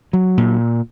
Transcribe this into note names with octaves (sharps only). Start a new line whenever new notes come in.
F#3
A#2